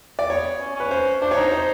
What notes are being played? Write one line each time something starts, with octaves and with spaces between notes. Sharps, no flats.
D5
B3 C#5
C#4
C#4 B4
C5
D4 C5
C#5
D#4
C5
C5